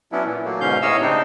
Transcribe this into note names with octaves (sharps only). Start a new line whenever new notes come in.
F#3 B3 C#4 D4 E4
A#2 E3
F#3 A3 A#3
G#2 B2 D3 C#4 F5 G6
A2 C3 C#5 D#5 F5 E6
C#3 C4 D4 D#4